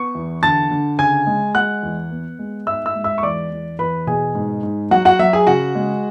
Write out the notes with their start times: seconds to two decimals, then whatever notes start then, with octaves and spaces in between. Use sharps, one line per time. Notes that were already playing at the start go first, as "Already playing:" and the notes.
Already playing: B3 C#6 C#7
0.15 E2
0.43 D3 A5 A6
0.71 D3
0.99 C#3 G#5 G#6
1.27 G#3
1.55 G#3 F#5 F#6
1.83 E2
2.11 B3
2.39 G#3
2.67 G#2 E5 E6
2.86 E5 E6
2.95 G#3
3.04 E5 E6
3.18 C#6
3.23 E2 D5 D6
3.51 E2
3.79 E2 B4 B5
4.07 B2 G#4 G#5
4.35 G#2
4.63 G#2
4.91 F#3 F#4 F#5
5.05 F#4 F#5
5.19 F#3 E5
5.33 G#4 G#5
5.47 C#3 F#4 F#5
5.75 G#3